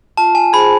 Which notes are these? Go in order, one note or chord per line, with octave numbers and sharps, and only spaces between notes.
F4 A5
G#5
G#4 C5 B5